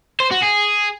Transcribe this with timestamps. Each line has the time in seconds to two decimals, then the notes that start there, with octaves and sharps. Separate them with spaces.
0.20 C5
0.31 F#4
0.42 G#4